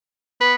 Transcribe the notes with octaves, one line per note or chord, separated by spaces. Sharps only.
B3 B4